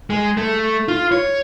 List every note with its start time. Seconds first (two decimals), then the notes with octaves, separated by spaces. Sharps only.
0.10 G#3
0.37 A3
0.88 F4
1.12 C#5